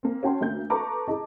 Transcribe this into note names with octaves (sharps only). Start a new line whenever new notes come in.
A#3 C4
C#4 F#4 G5 A5 C6
D2 A#3 G6
A4 B4 A5 A#5 C#6 D6
E4 G#4 D#5 A5